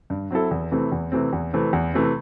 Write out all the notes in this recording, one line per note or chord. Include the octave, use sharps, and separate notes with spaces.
G2
F#3 C4 E4 A4
E2
C3 E3 A3 C4
E2
C3 E3 A3 C4
E2
C3 E3 A3 C4
E2
C3 E3 A3 C4